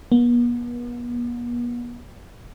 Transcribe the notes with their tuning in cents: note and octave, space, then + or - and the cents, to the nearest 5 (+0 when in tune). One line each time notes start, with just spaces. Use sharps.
B3 -45